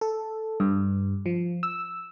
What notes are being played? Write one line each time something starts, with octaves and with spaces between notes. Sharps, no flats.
A4
G2
F3
E6